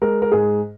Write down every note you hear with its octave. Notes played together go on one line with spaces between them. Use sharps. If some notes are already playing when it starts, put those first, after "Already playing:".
G#3 A#4
A#4
G#2 G#4